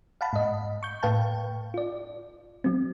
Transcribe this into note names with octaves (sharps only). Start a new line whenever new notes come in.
F5 F#5 A5 B5
G#2 D#5
C#6 G6
A2 B4 F5 G5 A5
F4 D5
F#3 C4